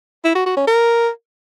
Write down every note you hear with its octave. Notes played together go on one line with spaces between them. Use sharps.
E4
F#4
F#4
C#4
A#4